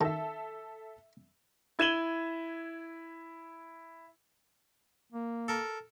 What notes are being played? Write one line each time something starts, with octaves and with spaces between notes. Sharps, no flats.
D#3 A4 E5
E4 G#6 D#7 E7 F#7 G7
A#3
A4 A#4